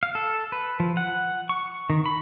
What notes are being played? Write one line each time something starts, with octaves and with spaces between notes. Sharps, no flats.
F5
A4
B4
F3
F#5
C#6
D#3
B5